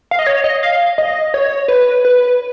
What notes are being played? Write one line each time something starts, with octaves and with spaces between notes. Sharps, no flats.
F5
D#5
C#5
D#5
F5
D#5
C#5
B4
B4